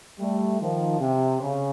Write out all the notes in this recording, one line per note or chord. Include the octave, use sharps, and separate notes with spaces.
G3 A3
D#3 F3
C3
C#3